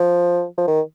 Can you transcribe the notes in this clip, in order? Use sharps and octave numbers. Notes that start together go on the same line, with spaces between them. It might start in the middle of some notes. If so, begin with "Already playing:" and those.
Already playing: F3
F3
D#3